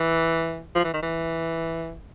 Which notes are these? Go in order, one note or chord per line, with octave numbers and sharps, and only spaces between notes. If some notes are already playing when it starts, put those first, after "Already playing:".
Already playing: E3
F3
E3
D#3
E3